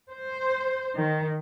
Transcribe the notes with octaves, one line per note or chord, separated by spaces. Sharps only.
C5
D#3